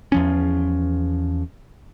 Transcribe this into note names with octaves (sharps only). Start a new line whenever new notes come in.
E2 F3 C#4